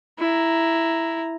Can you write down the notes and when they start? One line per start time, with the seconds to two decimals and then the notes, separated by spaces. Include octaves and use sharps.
0.19 E4 A#5